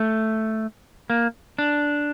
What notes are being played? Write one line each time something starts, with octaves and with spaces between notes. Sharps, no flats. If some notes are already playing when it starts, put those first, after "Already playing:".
Already playing: A3
A#3
D4